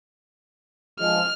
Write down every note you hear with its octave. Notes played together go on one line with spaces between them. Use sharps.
F3 G#3 F6